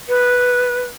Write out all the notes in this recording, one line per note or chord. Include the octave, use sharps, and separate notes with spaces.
B4